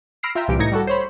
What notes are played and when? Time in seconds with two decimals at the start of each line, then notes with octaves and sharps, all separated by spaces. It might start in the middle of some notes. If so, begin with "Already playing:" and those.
0.23 B5 E6 F6 A#6 C7 D7
0.35 F4 E5 G5 A#5
0.48 C2 A#2 E3 G3 G4 D7
0.59 A2 E3 D#4 G#6 A#6 C#7
0.72 G3 F#4 A4
0.87 C5 C#5 B5